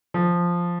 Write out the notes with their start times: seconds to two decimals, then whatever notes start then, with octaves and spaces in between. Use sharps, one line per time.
0.14 F3